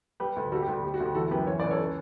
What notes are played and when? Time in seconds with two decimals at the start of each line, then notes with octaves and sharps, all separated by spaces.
0.20 G3 G4 B4
0.36 D2
0.52 G3 F#4 A4
0.62 G4
0.67 D2
0.73 G4
0.83 G3 G4
0.94 F#4
1.00 D2
1.05 G4
1.15 E3 F#4 A4
1.31 F#2 G4 B4
1.46 E3 C#5
1.60 C#2 D5
1.71 A4 C#5
1.79 C#4